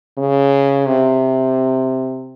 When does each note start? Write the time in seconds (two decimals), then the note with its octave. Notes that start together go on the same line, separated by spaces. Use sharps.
0.18 C#3
0.86 C3